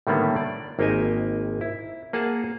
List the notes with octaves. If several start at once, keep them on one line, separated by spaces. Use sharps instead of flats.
A2 D3 D#3 G3 A#3 B3
D5
G#1 A#3 D#4 G4 D#5 G#5
E4
A#3 G#4 F#5 A5